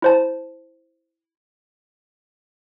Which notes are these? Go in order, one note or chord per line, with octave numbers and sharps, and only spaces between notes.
E4 C5 A5